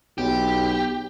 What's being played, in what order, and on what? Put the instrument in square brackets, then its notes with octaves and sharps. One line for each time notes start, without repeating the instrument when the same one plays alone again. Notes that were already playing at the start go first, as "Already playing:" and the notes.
[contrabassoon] B1 [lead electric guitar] G4